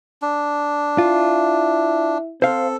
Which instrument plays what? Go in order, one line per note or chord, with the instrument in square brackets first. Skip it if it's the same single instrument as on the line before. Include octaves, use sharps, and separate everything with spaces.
[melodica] D4
[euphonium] E4 [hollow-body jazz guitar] F4
[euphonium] C4 [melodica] A4 [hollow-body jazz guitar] C5 F5